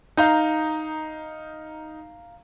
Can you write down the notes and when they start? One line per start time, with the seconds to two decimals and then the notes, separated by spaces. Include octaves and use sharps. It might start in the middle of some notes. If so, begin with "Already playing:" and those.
0.17 D#4 F5 A#5 G6